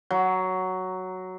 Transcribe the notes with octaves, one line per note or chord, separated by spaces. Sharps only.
F#3